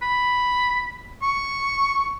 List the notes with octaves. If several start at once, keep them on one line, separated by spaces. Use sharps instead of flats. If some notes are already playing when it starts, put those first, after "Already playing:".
B5
C#6